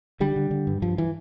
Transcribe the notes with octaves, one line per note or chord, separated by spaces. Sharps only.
D3 G3
D3
D3
G2
G2 F3
E3